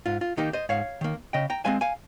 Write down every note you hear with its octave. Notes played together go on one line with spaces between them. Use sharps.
G#2 F4
F4
D#3 A#3 D#4 G4
C5 D#5
G#2 C#5 F5
D#3 A#3
C#3 D#5 G5
G5 A#5
G#3 C4 F5 G#5
F5 G#5